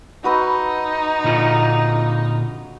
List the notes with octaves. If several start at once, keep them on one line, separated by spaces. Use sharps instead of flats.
D#4 F#4 B4 E6
A#2 D3 F4